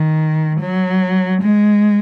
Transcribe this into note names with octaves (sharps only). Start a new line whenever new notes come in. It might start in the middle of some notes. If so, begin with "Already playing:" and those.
Already playing: D#3
F#3
G#3